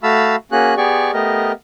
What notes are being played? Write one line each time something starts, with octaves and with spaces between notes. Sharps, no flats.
A3 F#4 F5 A5 B5 E6
A#3 C#4 F#4 G#4 F#6
B3 G4 G#4 D5 C#6
A3 B3 G4 A#4 D#5